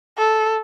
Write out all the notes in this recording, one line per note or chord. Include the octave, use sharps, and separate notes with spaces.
A4